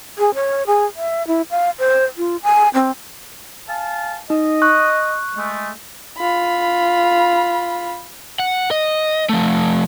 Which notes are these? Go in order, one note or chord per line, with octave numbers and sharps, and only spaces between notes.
G#4
C#5
G#4
E5
E4
F5
C5
F4
G#5
C4
F5 G#5 A5
D#4 D#5
C#6 F#6
G#3 A3
F4 B5
F#5
D#5
F3 A3